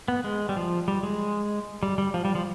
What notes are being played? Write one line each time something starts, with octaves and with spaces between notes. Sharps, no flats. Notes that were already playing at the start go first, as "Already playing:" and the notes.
B3
G#3
G3
F3
G3
G#3
G3
G3
F3
G3
F3